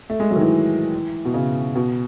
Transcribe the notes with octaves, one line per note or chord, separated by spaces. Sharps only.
A3
G#3
F#3
D#3
E3
B2
C#3
B2